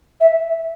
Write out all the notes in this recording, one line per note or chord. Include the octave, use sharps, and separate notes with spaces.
E5